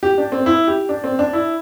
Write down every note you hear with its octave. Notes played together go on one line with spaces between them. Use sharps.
G4
D4
C4
E4
G4
D4
C4
D4
E4